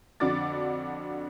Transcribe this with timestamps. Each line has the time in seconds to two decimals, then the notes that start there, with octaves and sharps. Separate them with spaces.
0.20 F2 D3 D4 F#4 D6 A6